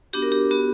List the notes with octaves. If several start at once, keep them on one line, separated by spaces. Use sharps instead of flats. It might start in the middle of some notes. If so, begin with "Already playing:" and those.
B3 D4 F#4 G4
A#4
G4
B3 F#4